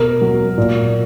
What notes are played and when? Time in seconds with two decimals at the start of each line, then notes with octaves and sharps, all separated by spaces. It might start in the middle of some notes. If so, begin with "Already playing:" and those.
Already playing: B2 A#4
0.21 F#3
0.58 A#2